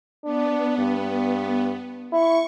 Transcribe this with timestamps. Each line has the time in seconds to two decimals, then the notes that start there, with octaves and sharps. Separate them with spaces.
0.25 B3 D4
0.78 G2
2.13 E4 C#6